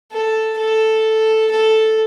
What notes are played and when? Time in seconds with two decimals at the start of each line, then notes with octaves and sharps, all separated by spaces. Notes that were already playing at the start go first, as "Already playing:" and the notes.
0.11 A4
0.58 A4
1.51 A4